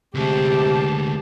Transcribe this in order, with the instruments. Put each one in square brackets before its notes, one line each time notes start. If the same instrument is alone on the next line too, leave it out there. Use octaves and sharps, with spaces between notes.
[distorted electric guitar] D2 G#3 [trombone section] C3 [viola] G4 A5